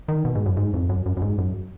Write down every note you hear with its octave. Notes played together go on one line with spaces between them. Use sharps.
D#3
B2
G#2
F#2
G#2
F2
F#2
F#2
F#2
G#2
F#2